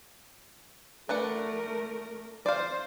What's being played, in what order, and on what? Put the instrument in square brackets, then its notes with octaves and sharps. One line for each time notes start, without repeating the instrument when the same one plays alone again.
[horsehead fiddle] A3 A#4 [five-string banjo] D4 B4 F#5
[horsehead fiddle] C5 [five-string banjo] D5 F5